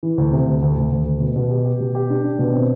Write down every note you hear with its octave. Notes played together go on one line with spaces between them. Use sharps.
E3
D2
C3
D2
D2
D2
D2
D2
B2
B2
G4
G4
B2
G4
D4
D4
B2
C4